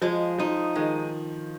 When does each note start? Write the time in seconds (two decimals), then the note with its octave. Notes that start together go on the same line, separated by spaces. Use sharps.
0.02 F3 G#3
0.38 F3 D#4
0.75 D#3 G#3